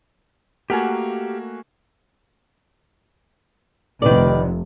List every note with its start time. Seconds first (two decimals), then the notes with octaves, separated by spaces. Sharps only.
0.70 A3 A#3 F#4 G4 A#4 F#5 G#5
4.02 F1 C3 D#3 B4 D5